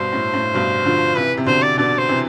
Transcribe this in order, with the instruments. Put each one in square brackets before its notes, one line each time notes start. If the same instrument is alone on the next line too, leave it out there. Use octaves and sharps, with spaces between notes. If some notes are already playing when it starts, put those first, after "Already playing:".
Already playing: [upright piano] G2 B2 [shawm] C5
[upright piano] A2
A2
G2 B2
D3 F3
[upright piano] C3 E3 [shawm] B4
[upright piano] C3
[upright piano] B2 D3 [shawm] C5
[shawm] D5
[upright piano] B2 D3 [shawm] D5
[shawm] C5
[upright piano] C3 E3